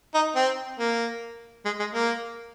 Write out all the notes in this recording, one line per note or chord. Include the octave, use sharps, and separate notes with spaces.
D#4
C4
A#3
G#3
G#3
A#3